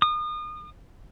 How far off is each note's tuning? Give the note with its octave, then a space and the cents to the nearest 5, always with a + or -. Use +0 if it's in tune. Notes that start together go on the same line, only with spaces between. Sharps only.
D#6 -35